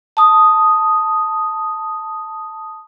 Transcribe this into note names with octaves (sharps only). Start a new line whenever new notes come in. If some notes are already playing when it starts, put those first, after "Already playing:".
A5 D#6